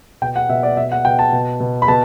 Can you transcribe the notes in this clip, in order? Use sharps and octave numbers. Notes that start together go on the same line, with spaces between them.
B2 G5
F#5
B2 E5
D5
B2 E5
F#5
B2 G5
A5
B2
B2
B5
B2 A5